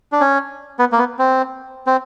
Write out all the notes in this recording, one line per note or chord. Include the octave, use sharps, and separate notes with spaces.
D4
C#4
B3
A#3
B3
C4
C4